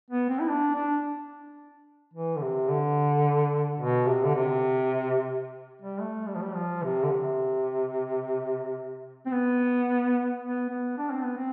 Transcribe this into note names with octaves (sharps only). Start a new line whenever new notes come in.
B3
C4
E4
D4
D4
E3
D3
C3
D3
B2
C3
D3
C3
G3
A3
G3
F3
G3
F3
C3
D3
C3
C4
B3
B3
B3
D4
C4
B3
C4